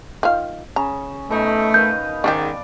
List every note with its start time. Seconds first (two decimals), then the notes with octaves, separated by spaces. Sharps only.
0.23 D#3 F4 F5
0.76 C#3 A#5
1.30 B2 A3 D#4
1.74 D#3 B4 F5 G6
2.24 G#2 D#3 C#4 D#4 G4 D5